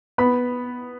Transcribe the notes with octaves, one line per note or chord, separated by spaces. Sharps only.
B3 B5